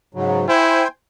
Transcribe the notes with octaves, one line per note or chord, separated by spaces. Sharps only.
G#2 C#3 F#3
E4 C5 G5 G#5